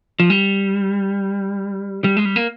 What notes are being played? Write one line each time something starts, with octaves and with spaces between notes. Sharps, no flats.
F3
G3
G3
G#3
G3
A#3